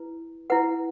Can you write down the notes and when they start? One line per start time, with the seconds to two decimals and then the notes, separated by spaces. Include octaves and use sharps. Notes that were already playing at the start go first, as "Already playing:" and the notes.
Already playing: E4 B4
0.50 E4 B4 F#5